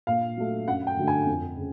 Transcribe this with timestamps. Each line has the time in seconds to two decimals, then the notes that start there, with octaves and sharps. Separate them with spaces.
0.07 A#2 F5
0.37 F#3 A3
0.67 F#2 F#5
0.87 G5
0.97 D3 F#3 A3
1.08 G#5
1.27 F2
1.57 C#3